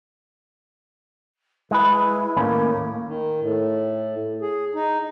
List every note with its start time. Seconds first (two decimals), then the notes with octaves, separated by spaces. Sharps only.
1.71 G#3 E4 G#4 B4
2.37 D#2 A2 A#3 C#4
3.06 D#3
3.40 A2
4.41 G#4
4.75 D#4